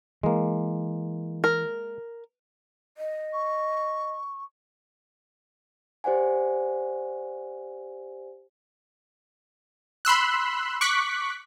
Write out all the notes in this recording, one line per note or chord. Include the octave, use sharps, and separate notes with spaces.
E3 G#3 A#3
A#4
D#5
C#6
G4 C5 D5 F#5 G#5
B5 C6 E6 F#6
C#6 D6 F#6 B6